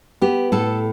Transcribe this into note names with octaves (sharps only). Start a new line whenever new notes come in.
B3 G4
A2 A4